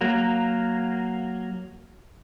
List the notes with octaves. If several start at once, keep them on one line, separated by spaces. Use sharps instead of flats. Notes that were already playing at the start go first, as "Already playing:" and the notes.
F#3 A#3